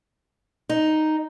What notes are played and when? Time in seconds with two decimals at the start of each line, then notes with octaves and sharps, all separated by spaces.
0.69 D#4